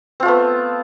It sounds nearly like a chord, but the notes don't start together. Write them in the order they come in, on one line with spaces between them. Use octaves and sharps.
C4 F4 A3 B3